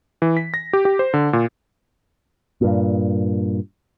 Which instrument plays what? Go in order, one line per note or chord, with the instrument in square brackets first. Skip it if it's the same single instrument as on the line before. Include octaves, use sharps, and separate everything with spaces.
[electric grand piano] E3
B6
A#6
G4
G4
C5
D3
A#2
[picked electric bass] G2 A#2